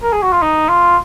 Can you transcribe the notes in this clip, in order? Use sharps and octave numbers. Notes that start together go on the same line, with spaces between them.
A#4
G#4
F#4
F4
D#4
F4